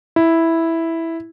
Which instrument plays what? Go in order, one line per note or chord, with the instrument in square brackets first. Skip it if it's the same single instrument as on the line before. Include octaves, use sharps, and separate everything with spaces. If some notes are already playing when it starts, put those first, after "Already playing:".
[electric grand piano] E4